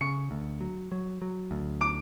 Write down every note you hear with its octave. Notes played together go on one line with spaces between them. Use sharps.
C#3 C#6 C#7
D2
F#3
F#3
F#3
D2
D6 D7